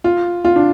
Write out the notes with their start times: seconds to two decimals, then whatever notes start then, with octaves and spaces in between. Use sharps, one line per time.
0.04 F4
0.45 F4
0.56 D4